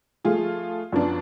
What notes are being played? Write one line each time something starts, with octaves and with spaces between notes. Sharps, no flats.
F3 A3 F4 G#4
F#2 F3 B3 D4